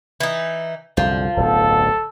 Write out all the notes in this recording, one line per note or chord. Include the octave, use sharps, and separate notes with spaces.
E3 D#4
C2 F#2 D3 F3
D1 B1 B2 A4